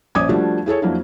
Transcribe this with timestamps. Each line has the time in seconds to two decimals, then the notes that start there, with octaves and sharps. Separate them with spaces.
0.15 A#1 C#4 D5 D6 D#6 G#6
0.29 F3 G3 A3 D4 F#4
0.66 E4 G#4 A4 C#5
0.82 F2 F#3 A#3 D4 E4